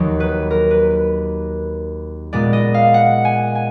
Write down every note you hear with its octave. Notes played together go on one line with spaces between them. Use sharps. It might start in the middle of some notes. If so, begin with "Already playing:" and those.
Already playing: D#2 D#3 F#3
B4
A#4
B4
B4
A#2 G#3 B3 D5
D#5
F5
F#5
G#5
G#5